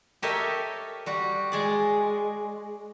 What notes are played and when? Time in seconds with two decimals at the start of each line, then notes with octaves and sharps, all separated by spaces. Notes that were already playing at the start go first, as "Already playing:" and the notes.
0.22 G4 A4 A#4 C#5 D#5 E5
1.06 G3 F#4
1.52 G#3 G#4 D5